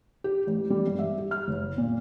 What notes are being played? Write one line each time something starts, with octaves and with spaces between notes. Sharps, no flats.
G4
A1
G3
G2
E5
G4
F6
F#1
A#2